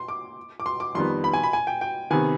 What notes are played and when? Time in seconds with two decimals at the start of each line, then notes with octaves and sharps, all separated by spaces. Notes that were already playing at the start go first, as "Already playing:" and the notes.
Already playing: C6
0.08 D6
0.60 D6
0.66 C6
0.80 D6
0.95 F2 D#3 G3 B3 C6
1.24 B5
1.33 G#5
1.43 B5
1.53 G#5
1.67 G5
1.81 G5
2.10 C3 D#3 B3 G#5